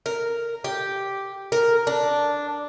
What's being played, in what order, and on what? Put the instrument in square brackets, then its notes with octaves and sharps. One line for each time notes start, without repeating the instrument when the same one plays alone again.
[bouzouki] A#4
G4
A#4
D4